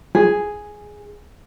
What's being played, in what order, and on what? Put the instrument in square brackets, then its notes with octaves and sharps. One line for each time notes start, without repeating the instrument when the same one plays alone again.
[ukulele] G#4